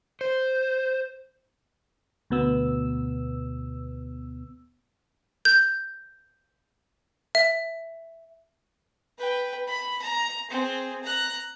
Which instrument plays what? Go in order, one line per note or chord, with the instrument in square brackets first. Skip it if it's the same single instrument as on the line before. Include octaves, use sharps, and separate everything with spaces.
[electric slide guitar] C5
[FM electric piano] D2 B2 B3 E6
[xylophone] G6
E5
[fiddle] B4 G5
B5
A#5
C4 G#4
A#5 F#6